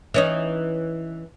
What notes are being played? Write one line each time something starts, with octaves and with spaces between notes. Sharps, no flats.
E3 C#4 D#4